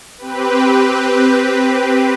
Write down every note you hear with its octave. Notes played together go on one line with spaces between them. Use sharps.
C4 G4 B4